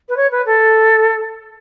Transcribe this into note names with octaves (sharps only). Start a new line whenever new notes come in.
B4
C#5
B4
A4